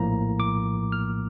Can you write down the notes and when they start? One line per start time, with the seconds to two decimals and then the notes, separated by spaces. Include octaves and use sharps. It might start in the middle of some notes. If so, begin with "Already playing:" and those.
Already playing: A#1 A2 F3 A#3 A#5
0.40 D6
0.92 F6